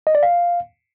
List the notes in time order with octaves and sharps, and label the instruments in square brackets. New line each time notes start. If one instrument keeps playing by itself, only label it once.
[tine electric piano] D#5
D5
F5